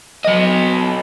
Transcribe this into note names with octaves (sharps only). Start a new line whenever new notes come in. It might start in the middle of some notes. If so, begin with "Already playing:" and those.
F#3 D#5